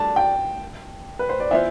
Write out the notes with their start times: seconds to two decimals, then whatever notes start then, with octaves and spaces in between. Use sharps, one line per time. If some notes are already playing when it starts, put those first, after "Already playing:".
Already playing: G3 D4 A4 A5
0.16 G5
1.19 B4
1.29 C5
1.40 D5
1.51 E3 B3 D4 F4 C5 E5